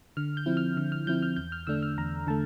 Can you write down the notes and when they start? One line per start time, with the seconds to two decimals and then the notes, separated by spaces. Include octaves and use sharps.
0.17 D3 F6
0.37 G6
0.46 F3 C4 E4
0.57 F6
0.77 D3 F6
0.92 F6
1.07 F3 C4 E4 G6
1.23 F6
1.36 E2 G6
1.52 F6
1.67 D3 A3 D4 E6
1.83 F6
1.98 E2 A#5
2.27 D3 A3 A5